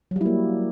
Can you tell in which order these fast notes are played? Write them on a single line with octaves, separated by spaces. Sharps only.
F#3 G3 E4 A#3